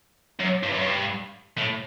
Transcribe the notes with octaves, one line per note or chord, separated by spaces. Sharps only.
F#2
G2
F#2
G2
A2